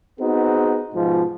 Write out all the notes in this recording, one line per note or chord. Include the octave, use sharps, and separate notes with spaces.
B3 C4 D#4 F#4 G#4
G#2 B2 F3